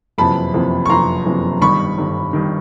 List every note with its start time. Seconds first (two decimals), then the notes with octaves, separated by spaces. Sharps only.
0.18 F#1 F2 C3 E3 A5 B5
0.54 F#1 F2 C3 E3
0.86 C#6
0.90 F#1 F2 C3 E3 A#5 C6
1.25 F#1 F2 C3 E3
1.62 G1 G2 D#3 B5 C#6
1.98 G1 G2 D#3
2.33 G2 D#3